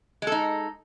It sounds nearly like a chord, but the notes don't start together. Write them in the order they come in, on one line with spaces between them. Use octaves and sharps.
G#3 A4 D#4